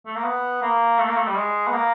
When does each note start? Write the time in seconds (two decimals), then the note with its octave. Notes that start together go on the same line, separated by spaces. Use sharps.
0.06 A3
0.16 A#3
0.24 B3
0.62 A#3
0.99 A3
1.08 A#3
1.16 A3
1.27 G3
1.36 G#3
1.67 B3
1.73 A#3